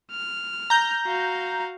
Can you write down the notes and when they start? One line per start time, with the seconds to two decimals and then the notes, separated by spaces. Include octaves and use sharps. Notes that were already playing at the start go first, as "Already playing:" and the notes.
0.12 F6
0.70 A#5 G6
1.05 F#4 F5